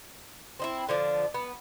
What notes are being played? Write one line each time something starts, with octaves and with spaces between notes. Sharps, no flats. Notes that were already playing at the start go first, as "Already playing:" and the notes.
C4 D#4 E4
D3 F3 D4
B3